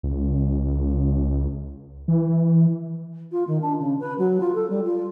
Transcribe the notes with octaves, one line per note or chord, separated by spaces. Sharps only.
C#2
E3
F4
D#3
D4
C#3
B4
F#3
F4
A4
G3
F4